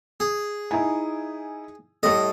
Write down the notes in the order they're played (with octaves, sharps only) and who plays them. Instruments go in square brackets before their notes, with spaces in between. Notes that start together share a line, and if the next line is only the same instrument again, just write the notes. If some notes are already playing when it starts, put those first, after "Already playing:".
[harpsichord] G#4
[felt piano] D#4 E4 G#5
[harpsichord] A2 D#5 [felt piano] G3 A4